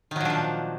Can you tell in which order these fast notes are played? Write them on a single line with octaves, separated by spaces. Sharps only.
D#3 F#3 A#2 D4 F3